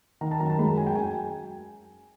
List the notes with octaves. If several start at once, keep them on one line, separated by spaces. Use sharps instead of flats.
D#3 A#5
A5
F#2 A#5
A5
G#3 B5
A#5
F#2 G#5
G5
F#2 G#5